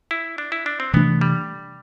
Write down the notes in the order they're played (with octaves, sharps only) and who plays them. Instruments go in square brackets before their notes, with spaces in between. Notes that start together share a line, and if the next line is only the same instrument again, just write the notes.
[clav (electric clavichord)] E4
D4
E4
D4
C4
[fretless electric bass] C3 E3 A3 D4 [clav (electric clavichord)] B3
[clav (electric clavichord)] G3